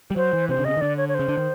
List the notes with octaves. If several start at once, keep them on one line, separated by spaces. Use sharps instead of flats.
G3
F#3 C5
E3
C3 C5
D3
C#3 D#5
D#3
D3 D5
C#5
C#5
C#3 C5
D3
D#3